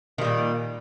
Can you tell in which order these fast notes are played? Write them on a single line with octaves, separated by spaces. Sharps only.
D#3 G3 A#2